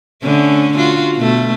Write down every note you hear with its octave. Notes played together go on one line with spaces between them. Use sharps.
D3 A3 C#4
F4 F#4
B2 A3